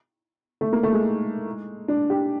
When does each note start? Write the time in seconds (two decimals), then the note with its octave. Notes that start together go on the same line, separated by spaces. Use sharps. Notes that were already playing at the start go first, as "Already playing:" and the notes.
0.61 A3
0.73 A#3
0.83 A3
0.93 G#3
1.88 D4
2.10 G4